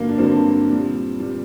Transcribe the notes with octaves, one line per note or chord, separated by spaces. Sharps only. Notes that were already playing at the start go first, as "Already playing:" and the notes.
Already playing: G2 D3 F#3 A#3
D4
G2 D3 F#3 C4
A#2 G3
A#2 G3